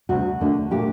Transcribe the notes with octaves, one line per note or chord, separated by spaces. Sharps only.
D2 C3 G3 F#4
D#2 D3 A3 D4
A#2 A3 D4 G4